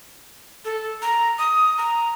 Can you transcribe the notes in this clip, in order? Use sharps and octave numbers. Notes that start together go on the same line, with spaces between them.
A4
A#5
D#6
A#5